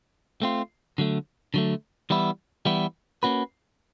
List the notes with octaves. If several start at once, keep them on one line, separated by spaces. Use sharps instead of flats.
A3 C4 F4
D3 F#3 A3
D3 F#3 A3
E3 G3 B3 E4
E3 G3 B3 E4
A#3 C#4 F#4 B4